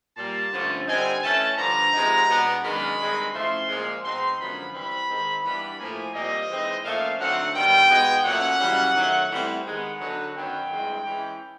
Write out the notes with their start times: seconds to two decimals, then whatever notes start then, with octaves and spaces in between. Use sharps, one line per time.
0.17 A#2 G3 A#3 A5
0.53 G2 D3 F3 A3 C#4
0.88 D3 G3 C4 D#4 G#5
1.23 E3 A3 C#4 A5
1.58 G2 D3 F3 A#5
1.93 C3 F3 G#3 B3 D#4
2.29 B2 G#3 B3 D4
2.63 F#2 D#3 G#3 B3 D4 B5
2.99 G2 D#3 G#3 C4 D#4
3.33 A2 F3 A3 C#4 C6
3.68 A#2 F3 G#3
4.04 B2 G#3 C4 D#4 C6
4.38 F#2 D3 F3 G#3 B3 B5
4.74 E3 G3 C4 B5
5.09 D#3 G#3 C4
5.44 G2 E3 G3 B3 D4 B5
5.79 A2 F3 A#3 G#5
6.14 A#2 G3 C4 D#5
6.49 E3 G#3 C4 D#4
6.84 A#2 F3 A3 C#4 F5
7.20 D3 F#3 A3 C4 D#4 F#5
7.54 G2 D#3 G3 B3 G5
7.90 B2 G#3 B3 D#4
8.25 A#2 F#3 A3 C#4 F#5
8.60 F#2 C#3 E3 G3
8.95 D#3 F#3 A3
9.31 A2 E3 G3 C4
9.65 D#3 G#3 B3 F#5
10.01 D3 F#3 B3 D#4
10.36 F#2 D#3 F#3 B3 G5
10.71 G2 E3 G#3 C4
11.06 E3 G#3 C#4